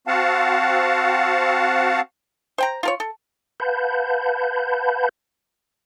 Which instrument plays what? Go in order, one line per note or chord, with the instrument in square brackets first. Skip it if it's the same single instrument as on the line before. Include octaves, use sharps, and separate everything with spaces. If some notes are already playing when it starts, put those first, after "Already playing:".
[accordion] C4 F#4 F5 F#5 A5
[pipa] C5 G5 A#5
F4 A#4 C#5
A4
[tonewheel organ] B4 F5 F#5 A5 B5 G6